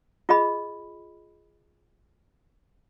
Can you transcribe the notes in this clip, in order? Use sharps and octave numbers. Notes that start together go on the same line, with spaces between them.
F4 G#4 D#5 B5